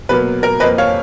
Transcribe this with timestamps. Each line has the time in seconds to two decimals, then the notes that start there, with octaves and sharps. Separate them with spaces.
0.09 B2 F#3 A#3 B4
0.43 A#4
0.60 F2 F3 A#3 B4 D#5
0.78 C#5 F5